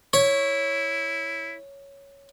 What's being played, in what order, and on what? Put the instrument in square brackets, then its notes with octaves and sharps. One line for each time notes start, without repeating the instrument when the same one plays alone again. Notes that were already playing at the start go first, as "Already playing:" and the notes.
[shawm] E4 [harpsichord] C#5